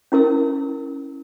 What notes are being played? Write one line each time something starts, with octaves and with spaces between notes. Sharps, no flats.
C#4 E4 A#4 E6